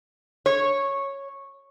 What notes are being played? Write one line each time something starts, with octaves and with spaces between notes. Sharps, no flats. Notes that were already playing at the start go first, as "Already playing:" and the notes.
C#5